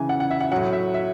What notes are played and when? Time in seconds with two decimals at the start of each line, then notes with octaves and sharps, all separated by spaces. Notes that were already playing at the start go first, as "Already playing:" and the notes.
Already playing: C#3 E3 G#5
0.09 F#5
0.20 F#5
0.30 E5
0.40 F#5
0.52 A2 F#3 F#5
0.73 E5
0.94 E5